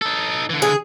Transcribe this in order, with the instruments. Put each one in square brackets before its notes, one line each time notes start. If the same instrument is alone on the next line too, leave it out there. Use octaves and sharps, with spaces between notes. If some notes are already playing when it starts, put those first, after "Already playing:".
[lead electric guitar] D#4 A4
D3 E3
[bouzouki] G#4